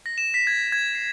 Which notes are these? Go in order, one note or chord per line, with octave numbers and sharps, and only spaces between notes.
A#6
E7
B6
G#6
G#6
C7